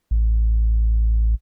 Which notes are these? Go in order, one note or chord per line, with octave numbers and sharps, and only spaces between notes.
A1